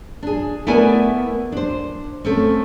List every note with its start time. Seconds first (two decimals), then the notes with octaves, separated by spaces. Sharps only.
0.23 D4 G#4
0.67 A3 B3 E4 A#4 D5 G#5
1.52 D4 C5
2.25 A3 C4 C#4